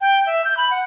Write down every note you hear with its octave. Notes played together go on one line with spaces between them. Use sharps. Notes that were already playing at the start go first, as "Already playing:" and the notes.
G5
E5
G6
B5
F#5